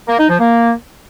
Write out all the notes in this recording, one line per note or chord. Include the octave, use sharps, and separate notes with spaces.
A#3
D#4
F3
A#3